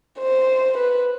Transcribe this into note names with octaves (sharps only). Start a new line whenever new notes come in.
C5
B4